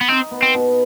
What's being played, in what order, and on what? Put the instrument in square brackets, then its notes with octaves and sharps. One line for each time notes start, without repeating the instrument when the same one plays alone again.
[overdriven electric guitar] B3
[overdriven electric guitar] C4 [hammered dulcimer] D#4
[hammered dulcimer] B3
[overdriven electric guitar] C4
[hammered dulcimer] B2